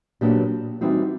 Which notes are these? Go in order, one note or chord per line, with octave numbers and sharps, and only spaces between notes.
A#2 F#3 B3 D4 G4
E3 G3 C4 D#4 F#4